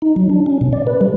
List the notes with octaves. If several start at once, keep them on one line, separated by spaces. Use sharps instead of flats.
D#4
F#3
D4
C#4
B2
D5
B4
G3